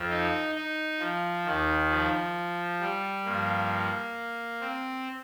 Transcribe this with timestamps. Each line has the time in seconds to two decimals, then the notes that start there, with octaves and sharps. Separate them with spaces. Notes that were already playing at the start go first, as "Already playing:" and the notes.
Already playing: F2 F3
0.10 D#4
0.55 D#4
1.00 F3
1.46 D#2 D#3
1.90 F3
2.80 G3
3.25 G2 F3 A#3
4.61 C4